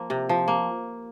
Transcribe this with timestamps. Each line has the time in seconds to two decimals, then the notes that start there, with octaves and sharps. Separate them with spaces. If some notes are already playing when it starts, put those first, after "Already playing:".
Already playing: F3 A#3
0.10 C3
0.29 F3
0.48 A#3